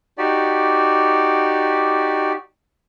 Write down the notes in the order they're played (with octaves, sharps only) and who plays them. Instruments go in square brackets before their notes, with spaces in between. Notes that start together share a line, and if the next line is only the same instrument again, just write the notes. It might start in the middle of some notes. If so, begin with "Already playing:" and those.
[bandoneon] D#4 F#4 G4 D5